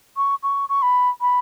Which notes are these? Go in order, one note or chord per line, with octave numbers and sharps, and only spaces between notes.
C#6
C#6
C#6
B5
B5